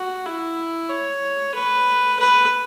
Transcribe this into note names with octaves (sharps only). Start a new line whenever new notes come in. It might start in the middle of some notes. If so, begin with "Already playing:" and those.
Already playing: F#4
E4
C#5
B4
B4